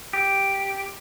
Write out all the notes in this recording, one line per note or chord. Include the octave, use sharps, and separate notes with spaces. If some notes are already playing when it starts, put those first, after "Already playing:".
G4